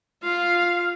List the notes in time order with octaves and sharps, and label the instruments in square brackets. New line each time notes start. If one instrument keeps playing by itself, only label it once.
[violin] F4 [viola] F5